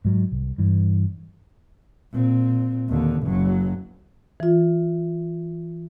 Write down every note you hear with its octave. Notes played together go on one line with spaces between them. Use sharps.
G#2 F#3
C2
G2 E3
A#2 C4
D#2 D3
F#1 F#3
E3 F4